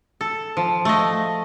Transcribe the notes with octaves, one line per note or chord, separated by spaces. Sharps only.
A4
F3
A3 D#5